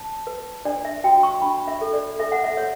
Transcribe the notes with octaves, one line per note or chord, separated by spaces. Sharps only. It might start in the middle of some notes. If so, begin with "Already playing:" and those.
Already playing: A5
B4
D4 D5
E5
F#4 G5
C#6
D4 B5
E5
A4
D5
A4 E5
F#5
E5
C#5